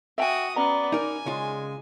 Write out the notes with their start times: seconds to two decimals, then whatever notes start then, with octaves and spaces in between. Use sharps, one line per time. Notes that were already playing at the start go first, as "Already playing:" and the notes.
0.18 F#4 E5 G5 G#5 D#6
0.56 B3 C#4 D5 A#5
0.92 D#4 A#4 G#5
1.26 C#3 G#3 F4